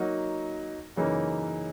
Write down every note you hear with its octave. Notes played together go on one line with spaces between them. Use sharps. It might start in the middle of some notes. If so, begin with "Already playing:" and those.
Already playing: F#3 A#3 D#4 F#4
F#2 C#3 E3 A#3 D#4